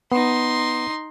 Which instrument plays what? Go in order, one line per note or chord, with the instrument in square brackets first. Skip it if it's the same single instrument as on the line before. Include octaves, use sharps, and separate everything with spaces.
[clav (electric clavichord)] B3 [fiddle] D#4 C6